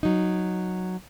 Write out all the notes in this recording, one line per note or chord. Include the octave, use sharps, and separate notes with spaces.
F#3 D#4